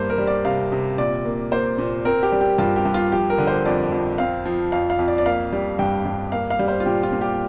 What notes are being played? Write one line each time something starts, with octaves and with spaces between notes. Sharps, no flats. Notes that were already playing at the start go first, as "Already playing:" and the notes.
Already playing: G2 A#3 C5
A#4
G3
D5
C3 F5
C3
A#2 D5
A#3
A#3 C5
A#2
C4 A#4
G4
G3
G4
G2 F4
G4
G2
F4
F3 G4
A#4
D3
C5
F2 D5
F2
C4 F5
F3
F2 F5
F5
F2
D5
D5
A#3 F5
G3
G2 G5
G2
A#3 F5
F5
G3
C5
F4
A#2 G4
F4
A#2
G4